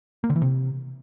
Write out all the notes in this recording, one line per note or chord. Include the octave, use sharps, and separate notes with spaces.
A#3
D3
E3
C3